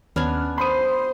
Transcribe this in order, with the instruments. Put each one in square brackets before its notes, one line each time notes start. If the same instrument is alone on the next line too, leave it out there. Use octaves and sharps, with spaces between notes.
[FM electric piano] D#2 C#4 F6 [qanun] B3 D4 G#5
[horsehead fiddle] C5 [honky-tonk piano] B5 D#7 [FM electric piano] C6 D#6